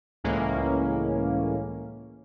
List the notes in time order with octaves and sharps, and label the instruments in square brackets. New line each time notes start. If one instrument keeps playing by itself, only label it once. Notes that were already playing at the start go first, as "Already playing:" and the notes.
[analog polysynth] C#2 A2 E3 G#3 A#3 C#4